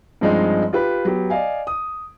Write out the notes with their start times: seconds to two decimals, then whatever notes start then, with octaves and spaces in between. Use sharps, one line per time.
0.21 G2 F3 G#3 C4 D#4
0.73 F4 G4 B4
1.05 F#3 B3 G4
1.30 D5 D#5 F5 G#5
1.67 D#6